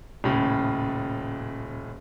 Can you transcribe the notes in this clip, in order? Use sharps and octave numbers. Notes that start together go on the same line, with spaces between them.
D#1 A2 C#3